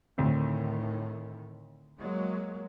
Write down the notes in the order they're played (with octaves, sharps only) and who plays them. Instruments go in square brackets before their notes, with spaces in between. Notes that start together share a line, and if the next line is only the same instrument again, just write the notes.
[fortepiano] D2 C4 [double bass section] A2 D#3
[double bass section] F#3 G#3 A#3